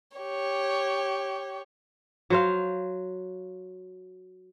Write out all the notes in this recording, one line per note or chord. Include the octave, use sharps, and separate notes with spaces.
G4 C#5
F#3 C5 F5